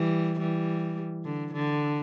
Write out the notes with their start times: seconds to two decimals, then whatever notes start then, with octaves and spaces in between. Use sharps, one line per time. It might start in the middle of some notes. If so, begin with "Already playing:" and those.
Already playing: E3 G3
0.39 E3 G3
1.24 D3
1.53 D3